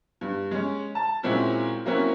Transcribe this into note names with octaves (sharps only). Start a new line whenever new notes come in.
G2
G#3 C#4
A5
A#2 G#3 C4 C#4 E4 F#4
F#3 A#3 C4 C#4 E4 F#4